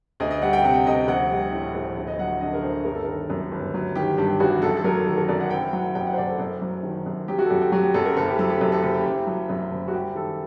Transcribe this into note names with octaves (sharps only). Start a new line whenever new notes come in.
D2 D#5
D#5
G3 F#5
G5
C3 F#5
D2 D#5
A#1 F#5
G3
A2
A#1
D2
D#5
F#3 F#5
D3 D#5
A#4
D2 C5
G1 A#4
A4
D#3 A#4
F#2
G1
F#3
D#3 G4
G2 G4
A1 F#4
F#2 A4
A4
F#3 A#4
D#3 A4
A#4
F#2 D5
F#5
F#1 G5
F#3 F#5
F#2 G5
F#5
C5
F#1 D5
A4
F#2
F#3
D#3
F#2
F#3 G4
F#4
A4
F#2 G4
G4
F#3 F#4
G4
F#2 A4
A#4
F#1 A4
G4
F#3 A4
G4
F#2 A4
A4
F#1 G4
G4
F#1
F#3
F#2
F#1
F#4
G3 G4
D#3 A4